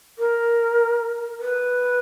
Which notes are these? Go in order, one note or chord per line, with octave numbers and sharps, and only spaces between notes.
A#4
B4